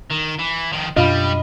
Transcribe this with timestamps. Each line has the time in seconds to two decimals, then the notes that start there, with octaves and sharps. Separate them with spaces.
0.10 D#3
0.39 E3
0.72 D#3 F3
0.96 F#2 B2 G3 D4 F4 D#5 B5